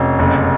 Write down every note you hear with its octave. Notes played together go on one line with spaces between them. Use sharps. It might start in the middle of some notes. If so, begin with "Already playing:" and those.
Already playing: F1 C#4
F#1